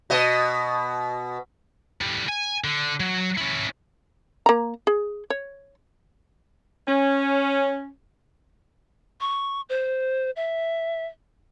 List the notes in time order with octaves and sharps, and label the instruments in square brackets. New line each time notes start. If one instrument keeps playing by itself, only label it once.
[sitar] B2 D#5
[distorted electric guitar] A2 G3
G#5
D3
F#3
C#4 E4
[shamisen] A#3 A#5
G#4
C#5
[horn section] C#4
[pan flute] C#6
C5
E5